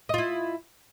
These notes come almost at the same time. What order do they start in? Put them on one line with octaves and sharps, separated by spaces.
D#5 F4 E4